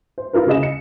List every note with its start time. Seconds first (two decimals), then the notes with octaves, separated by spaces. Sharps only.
0.18 C5
0.33 E4 F4 A#4 B4
0.47 C#3 G#4 D#5 E7
0.63 C#7